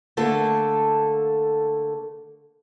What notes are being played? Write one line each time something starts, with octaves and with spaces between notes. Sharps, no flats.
D3 A3 A#3 A4